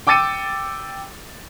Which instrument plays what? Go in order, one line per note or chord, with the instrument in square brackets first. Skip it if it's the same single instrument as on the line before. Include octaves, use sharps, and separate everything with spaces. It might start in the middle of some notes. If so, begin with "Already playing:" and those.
[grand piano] G5 D6 E6 A6 C#7 D#7